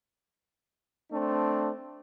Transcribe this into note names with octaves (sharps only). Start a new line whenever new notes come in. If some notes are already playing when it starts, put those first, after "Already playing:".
A3 C4 D4